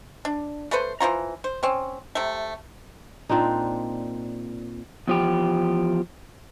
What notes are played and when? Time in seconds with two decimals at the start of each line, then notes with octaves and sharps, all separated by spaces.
0.25 D4
0.71 A3 A4 B4 C5
1.00 E3 F3 F4 A#5
1.44 C5
1.63 C4 C#4
2.15 C3 A3
3.29 A#2 C4 D4 D#4
5.08 E2 F3 G4